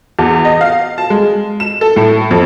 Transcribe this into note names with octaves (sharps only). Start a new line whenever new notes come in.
E2
D#5
F5
A5
G#3
E7
A4
A2
F2